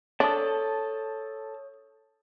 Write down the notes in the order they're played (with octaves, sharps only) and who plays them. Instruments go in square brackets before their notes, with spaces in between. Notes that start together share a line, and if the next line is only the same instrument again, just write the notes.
[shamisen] D4 [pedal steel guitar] A4 A5 [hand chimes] C#5 D#6